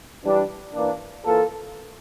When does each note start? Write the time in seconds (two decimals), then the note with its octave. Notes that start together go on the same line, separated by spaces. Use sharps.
0.23 E3 G3 D4
0.73 E3 A#3 D4
1.24 E3 A#3 F4 A4